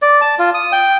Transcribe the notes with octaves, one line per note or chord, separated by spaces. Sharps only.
D5
A5
F4
D#6
G5